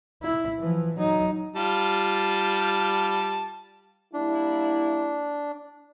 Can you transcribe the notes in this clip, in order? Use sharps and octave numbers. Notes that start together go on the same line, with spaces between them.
E4
E3 F3
F#3 D#4
G3 F4 A5
G3 A#3 D4 E4